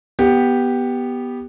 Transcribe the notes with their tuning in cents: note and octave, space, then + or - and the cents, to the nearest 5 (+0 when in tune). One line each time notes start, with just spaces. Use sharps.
B3 -10 G4 +0